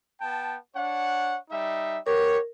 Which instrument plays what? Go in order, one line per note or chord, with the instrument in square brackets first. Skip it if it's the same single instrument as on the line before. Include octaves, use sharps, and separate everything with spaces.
[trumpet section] B3 G5 A5
D4 C#5 F#5
G3 D#4 E5
[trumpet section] B3 G4 C#5 [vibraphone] A#4